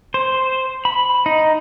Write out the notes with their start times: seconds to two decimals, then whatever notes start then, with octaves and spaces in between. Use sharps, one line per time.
0.14 C5
0.85 B5
1.26 D#4